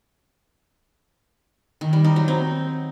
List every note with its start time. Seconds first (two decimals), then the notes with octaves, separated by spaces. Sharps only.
1.81 D#3
1.93 G3
2.05 D#4
2.16 F#3
2.28 C4